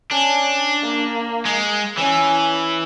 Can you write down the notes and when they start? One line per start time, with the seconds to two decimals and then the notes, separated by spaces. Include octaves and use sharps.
0.11 C#4 D4
0.82 A#3
1.45 G#3
1.98 E3 C#4